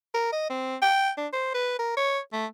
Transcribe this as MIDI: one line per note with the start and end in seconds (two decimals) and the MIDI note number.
0.14 0.32 70
0.32 0.47 75
0.50 0.76 60
0.82 1.11 79
1.17 1.27 62
1.33 1.52 72
1.54 1.76 71
1.79 1.97 70
1.97 2.19 73
2.33 2.46 57